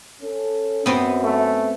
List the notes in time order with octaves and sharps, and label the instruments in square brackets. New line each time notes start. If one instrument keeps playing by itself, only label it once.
[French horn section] C#4 A4
[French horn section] F#2 [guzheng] B3 C4
[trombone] A3